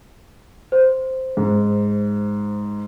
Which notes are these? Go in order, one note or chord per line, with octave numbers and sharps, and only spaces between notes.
C5
G#2